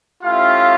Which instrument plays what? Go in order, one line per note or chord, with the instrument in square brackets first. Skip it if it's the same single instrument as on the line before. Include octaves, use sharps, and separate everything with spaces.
[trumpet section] A3 C#4 E4 F4 G4 F5